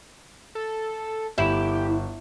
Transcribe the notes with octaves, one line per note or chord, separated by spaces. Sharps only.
A4
G1 E4 G4